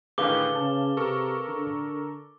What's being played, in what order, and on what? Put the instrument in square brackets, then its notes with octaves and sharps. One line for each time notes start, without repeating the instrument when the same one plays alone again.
[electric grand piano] A2 D3 D#3 [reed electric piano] G#4 B4 F5 [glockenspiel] D6 G7
[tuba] C#3 [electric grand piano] A5
[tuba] C3 [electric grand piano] A4 A#4 C#6
[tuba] D3